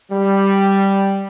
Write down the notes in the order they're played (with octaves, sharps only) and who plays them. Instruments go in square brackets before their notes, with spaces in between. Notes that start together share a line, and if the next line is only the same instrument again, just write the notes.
[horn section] G3